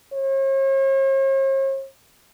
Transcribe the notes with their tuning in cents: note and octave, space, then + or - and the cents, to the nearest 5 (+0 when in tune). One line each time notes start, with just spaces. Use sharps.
C#5 -45